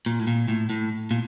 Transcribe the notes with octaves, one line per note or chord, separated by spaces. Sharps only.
A#2
A2
A#2
A2
A2
A#2